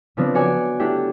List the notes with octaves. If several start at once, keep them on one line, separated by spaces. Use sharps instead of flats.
C#3 F3 B3 C4 D4
F#4 C#5 D5 F#5 G#5
A3 D4 E4 G4